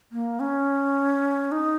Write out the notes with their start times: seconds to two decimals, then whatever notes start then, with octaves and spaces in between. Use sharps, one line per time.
0.12 A#3
0.40 C#4
1.52 D#4